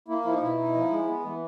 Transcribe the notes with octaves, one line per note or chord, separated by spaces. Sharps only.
A#3 E4
F3 E4
D#4
B2 E4
D#4
F3
G#3
B3
E3